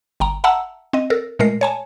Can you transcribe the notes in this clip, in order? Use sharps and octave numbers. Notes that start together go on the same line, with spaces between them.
G1 G5 A#5
E5 F#5 A5 A#5 E6
C4 D#5
A4 A#4
A#2 G#3 A3 A#4 C7
C#5 G#5 A5